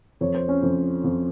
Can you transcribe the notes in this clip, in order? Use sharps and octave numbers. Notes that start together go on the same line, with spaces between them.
F2 C#5
C5
C#4 C#5
F2
F2